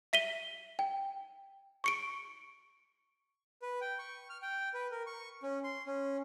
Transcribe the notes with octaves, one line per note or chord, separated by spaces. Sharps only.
E5 B6 D#7 G7
G5
C#6 C#7 D7
B4
G5
C#6
F6
G5
B4
A#4
C#6
C#4
C6
C#4